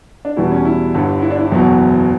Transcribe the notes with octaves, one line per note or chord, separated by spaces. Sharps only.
D4
E2 B2 G3 E4
C#4
E4
G1 G2 D3
E4
D4
E4
F#1 E2 B2 F#3